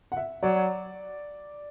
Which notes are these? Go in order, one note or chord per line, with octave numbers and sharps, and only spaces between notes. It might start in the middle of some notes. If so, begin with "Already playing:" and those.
F#5
E5
F#3 D5